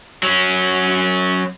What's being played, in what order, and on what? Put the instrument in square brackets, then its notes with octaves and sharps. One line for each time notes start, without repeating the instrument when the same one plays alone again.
[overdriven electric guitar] F#3 C#4